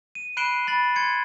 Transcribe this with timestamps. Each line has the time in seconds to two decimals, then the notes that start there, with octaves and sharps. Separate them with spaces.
0.15 D#7
0.37 B5 F#6 C7 D7 E7 G7
0.67 B5 A6 F#7
0.96 C6 G#6 C#7